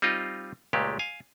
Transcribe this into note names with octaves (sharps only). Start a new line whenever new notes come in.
G3 C4 D#4 F4 D#5
C#2 A#2 G#3 A3 G4
F5 G#5